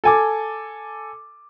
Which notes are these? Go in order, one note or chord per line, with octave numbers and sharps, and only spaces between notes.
A4 G#5 D6